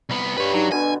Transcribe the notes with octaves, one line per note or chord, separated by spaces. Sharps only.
C2 B3
G2 B4 C#5
F#3 D#4
B2 D3 D4 G#5